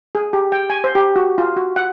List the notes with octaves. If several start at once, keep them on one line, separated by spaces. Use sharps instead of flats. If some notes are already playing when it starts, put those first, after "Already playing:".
G#4
G4
G5
G#5
C5
G4
F#4
F4
F#4
F#5